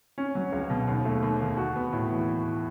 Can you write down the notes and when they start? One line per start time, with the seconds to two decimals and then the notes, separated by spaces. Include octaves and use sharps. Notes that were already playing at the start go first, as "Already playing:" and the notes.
0.18 C#4
0.35 F#3
0.52 C#2
0.70 B2
0.87 D#2
1.05 A3
1.23 D#2
1.41 D#3
1.57 F#4
1.76 B3
1.92 A2
2.10 E3